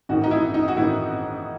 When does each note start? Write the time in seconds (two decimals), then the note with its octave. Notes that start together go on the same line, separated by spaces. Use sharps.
0.09 A1 G#2 D#3 F#4
0.24 D#4
0.31 E4
0.54 D#4
0.68 F#4
0.77 A1 G#2 D#3 E4